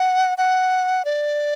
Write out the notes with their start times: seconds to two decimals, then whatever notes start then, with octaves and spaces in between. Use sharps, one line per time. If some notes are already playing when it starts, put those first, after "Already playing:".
Already playing: F#5
0.38 F#5
1.05 D5